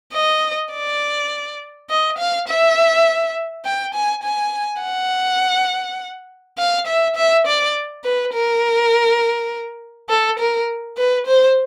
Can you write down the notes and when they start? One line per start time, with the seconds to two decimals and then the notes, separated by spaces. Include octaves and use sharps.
0.14 D#5
0.72 D5
1.90 D#5
2.19 F5
2.48 E5
3.65 G5
3.94 G#5
4.23 G#5
4.82 F#5
6.58 F5
6.87 E5
7.16 E5
7.46 D5
8.05 B4
8.33 A#4
10.09 A4
10.39 A#4
10.98 B4
11.27 C5